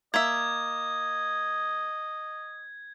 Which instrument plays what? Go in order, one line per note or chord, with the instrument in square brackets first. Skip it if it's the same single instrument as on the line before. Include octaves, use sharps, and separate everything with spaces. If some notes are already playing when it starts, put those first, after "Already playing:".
[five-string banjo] A#3 E5 [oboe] D#5 [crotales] G#6